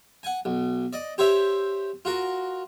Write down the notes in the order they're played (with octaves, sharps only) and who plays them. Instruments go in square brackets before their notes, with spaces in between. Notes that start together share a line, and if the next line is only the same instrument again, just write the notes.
[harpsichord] F#5 G#5
B1
D5 D#5
G4 C5 C#5 E5
F4 F#4 A#4